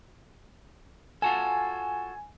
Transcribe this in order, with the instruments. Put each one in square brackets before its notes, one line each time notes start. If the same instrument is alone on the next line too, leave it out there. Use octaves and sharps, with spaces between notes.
[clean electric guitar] F4 F#4 A4 [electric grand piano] G#5